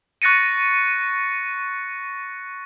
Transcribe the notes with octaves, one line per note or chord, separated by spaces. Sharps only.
C#6 F#6 A6 A#6 C#7 D#7